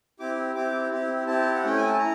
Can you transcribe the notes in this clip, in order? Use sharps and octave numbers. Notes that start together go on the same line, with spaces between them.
C4 E4 G4 D6
C4 E4 G4 D6
C4 E4 G4
C4 E4 G4 A5
F#5
A3 C#4 E4 G5
G#5
A5
E4 A#5